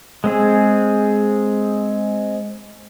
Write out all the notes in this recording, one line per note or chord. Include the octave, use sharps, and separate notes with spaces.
G#3 C4 G#4